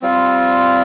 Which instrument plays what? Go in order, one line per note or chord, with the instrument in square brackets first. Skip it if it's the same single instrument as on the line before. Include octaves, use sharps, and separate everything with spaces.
[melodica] G3 C4 F4